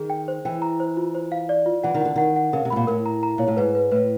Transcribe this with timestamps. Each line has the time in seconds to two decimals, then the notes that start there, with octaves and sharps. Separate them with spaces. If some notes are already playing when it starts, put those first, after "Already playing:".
Already playing: D#3 G#4
0.10 G5
0.28 C5
0.45 E3 G5
0.62 A#5
0.80 C5
0.97 F4
1.15 C5
1.32 F5
1.49 D5
1.66 F4
1.83 E3 F#5
1.94 D#3
2.01 D3 F#5
2.16 D#3 F#5
2.36 F#5
2.53 C#3 A#4
2.65 C3
2.70 A2 B5
2.76 A#2
2.87 A2 A#4
3.06 A#5
3.23 A#5
3.38 A#2 C#5
3.48 A2
3.57 G#2 B4
3.75 B4
3.91 A2 B4